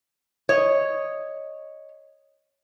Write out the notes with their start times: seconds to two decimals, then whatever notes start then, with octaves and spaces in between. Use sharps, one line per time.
0.49 C#5 D#5